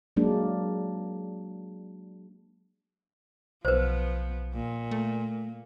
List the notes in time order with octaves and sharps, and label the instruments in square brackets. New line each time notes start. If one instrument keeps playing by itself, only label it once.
[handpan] F#3 G#3 A#3 D4
[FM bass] B1 [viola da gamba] F3 B3 [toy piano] B4 C5
[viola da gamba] A#2
[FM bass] A3